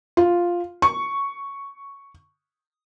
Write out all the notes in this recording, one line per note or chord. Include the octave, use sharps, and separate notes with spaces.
F4
C#6